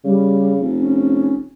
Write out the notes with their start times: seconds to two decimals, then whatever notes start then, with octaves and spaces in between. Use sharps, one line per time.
0.04 C#3 G3
0.61 F1
0.78 C#4